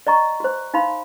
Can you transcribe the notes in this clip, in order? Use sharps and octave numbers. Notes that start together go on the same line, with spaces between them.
D5 D#5 A#5 C#6
F#4 C5
D#4 F5 B5 C6